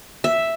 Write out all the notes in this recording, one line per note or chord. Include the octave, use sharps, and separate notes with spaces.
E5